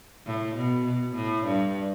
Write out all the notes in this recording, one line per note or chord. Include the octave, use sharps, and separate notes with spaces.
A2
B2
B2
A2
G2